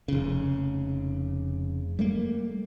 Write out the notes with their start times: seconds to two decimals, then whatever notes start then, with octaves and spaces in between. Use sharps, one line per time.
0.08 F1 C#3
1.99 G3 A3 A#3